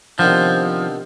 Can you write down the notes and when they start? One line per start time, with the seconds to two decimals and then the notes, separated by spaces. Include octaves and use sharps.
0.18 C3 D#3 F3 B3 D4